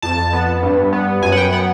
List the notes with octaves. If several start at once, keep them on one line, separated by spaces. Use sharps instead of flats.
F2 A5
B3
G2
B3
F#2 G#5
F#5
G5
B3 F#5